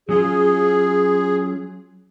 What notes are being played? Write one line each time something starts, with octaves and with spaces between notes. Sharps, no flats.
F#3 C#4 F4 G#4